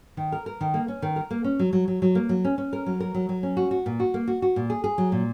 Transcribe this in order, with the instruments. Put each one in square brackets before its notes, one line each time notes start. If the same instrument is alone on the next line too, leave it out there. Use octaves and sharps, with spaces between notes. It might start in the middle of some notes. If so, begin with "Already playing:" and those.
[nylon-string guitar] D#3
A#4
A#4
D#3
A#3
C#4
D#3
A#4
A#3
C#4
F#3
F#3
F#3
F#3
A#3
F#3
C#4
C#4
A#4
F#3
A#4
F#3
F#3
C#4
F#4
F#4
A#2
F#4
A#3
F#4
F#4
A#2
G#4
G#4
F#3
A#2